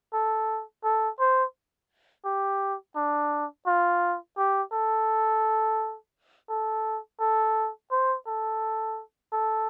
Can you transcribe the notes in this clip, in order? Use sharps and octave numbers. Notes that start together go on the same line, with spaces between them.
A4
A4
C5
G4
D4
F4
G4
A4
A4
A4
C5
A4
A4